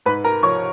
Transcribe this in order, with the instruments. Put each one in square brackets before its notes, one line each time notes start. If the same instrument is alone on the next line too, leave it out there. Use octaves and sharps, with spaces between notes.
[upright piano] G#2 B4 B5
A#4 A#5
F3 C#5 C#6